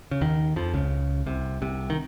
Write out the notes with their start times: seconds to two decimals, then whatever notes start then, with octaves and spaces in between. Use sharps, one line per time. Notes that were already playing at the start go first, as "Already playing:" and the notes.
0.11 C#3
0.21 D#2 D#3
0.56 F2 F3
0.74 C#2 C#3
1.26 C2 C3
1.62 C2 C3
1.90 D#3